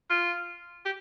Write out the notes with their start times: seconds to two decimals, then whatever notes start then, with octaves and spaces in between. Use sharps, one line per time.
0.10 F4
0.85 G4